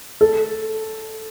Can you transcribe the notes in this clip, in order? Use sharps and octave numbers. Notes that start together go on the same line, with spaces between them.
A4